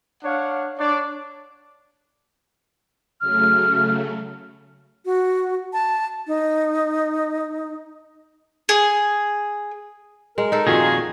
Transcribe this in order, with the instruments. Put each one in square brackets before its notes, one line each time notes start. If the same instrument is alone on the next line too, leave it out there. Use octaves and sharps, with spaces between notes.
[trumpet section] D4 C#5 F5 F#5
D4 C#5 D5
[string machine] C#3 F#3 A3 [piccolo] F6
[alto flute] F#4
A5
D#4
[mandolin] G#4
[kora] G#3 [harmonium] A#4
[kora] D#4 A4
[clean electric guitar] F2 A#2 D#3 [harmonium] F4 F#4 [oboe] G#4